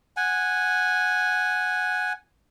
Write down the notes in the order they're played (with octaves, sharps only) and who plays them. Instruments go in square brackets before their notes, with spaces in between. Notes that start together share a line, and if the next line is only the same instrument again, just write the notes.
[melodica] F#5 G#5